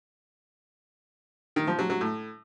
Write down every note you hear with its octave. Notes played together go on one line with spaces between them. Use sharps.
D#3
F3
F#3
F#3
A2